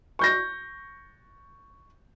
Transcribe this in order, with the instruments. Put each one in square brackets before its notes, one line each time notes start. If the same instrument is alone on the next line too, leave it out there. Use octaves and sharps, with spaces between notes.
[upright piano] C#6 G6 A#6